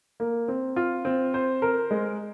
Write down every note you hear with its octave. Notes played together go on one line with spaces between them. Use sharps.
A#3
C4
F4
C4
C5
A#4
G#3